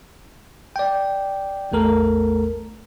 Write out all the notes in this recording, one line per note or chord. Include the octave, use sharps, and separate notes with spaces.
D5 G5
A1 E2 A3 A4 A#4